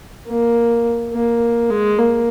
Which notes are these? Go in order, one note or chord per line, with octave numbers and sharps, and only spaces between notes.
A#3
A#3
G#3
A#3